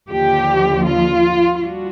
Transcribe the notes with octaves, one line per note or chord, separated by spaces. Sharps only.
D#2 D3 F3 G4
F4
G3 D4 F4 F#4